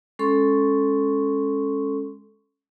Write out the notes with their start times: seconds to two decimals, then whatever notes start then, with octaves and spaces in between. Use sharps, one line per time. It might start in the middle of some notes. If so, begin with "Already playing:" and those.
0.19 G#3 C#4 A4 C6 C#6